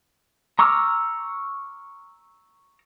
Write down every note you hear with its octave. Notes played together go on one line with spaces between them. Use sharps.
A#5 C#6 D6 E6 F6